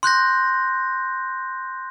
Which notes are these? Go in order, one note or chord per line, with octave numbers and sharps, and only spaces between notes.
C6 F#6 G6 A#6